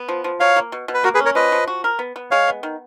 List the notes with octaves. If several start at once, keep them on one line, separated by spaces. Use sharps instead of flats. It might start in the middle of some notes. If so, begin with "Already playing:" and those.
Already playing: B3
F3
F3
F#3 C#5 F5
A#3
B2
B2
B4
A#3 F#4 A#4
G#4 B4
C#4
A#4 C#5
F3 B4 D#5
F3
F#4
A#4
B3
B3
G#3 C#5 F5
B3
D#3